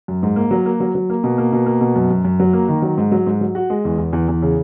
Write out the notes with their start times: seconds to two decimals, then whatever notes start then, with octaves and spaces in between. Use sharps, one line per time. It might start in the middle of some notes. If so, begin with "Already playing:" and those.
0.08 F#2
0.23 G#2
0.36 A#3
0.51 F#3
0.66 A#3
0.80 F#3
0.95 F#3
1.10 A#3
1.24 B2
1.38 A#3
1.53 B2
1.66 A#3
1.81 B2
1.96 F#2
2.10 F#2
2.25 F#2
2.40 F#3
2.53 A#3
2.68 D#3
2.82 F#3
2.97 G#2
3.12 F#3
3.26 G#2
3.41 F#3
3.55 F#4
3.70 G#3
3.85 E2
3.98 E2
4.13 E2
4.28 E2
4.42 C#3